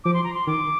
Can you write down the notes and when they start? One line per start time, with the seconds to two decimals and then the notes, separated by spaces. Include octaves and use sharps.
0.04 F3 D6
0.14 C6
0.24 A#5
0.34 C6
0.47 D#3 D6